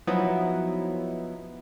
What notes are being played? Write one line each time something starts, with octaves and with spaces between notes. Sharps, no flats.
F3 F#3 B3 D#4 E4